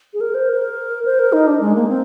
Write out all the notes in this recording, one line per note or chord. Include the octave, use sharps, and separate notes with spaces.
G#4
A#4
C5
A#4
C5
A#4
D#4
D4
G#3
A#3
C4